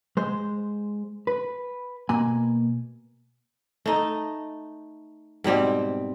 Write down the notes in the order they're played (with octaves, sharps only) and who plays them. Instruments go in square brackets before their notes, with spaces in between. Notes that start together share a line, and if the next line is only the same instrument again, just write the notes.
[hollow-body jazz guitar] G#3 C5
B4
B2 A#3 G#5
[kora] A3 D#4
G#2 B2 G3 C4